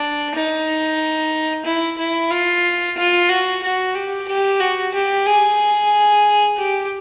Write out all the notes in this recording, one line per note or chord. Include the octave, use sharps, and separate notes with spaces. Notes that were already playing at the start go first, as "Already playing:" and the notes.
Already playing: D4
D#4
E4
E4
F4
F4
F#4
F#4
G4
G4
F#4
G4
G#4
G4